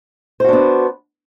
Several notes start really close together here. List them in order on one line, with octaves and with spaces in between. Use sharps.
C5 F#4 D4 B3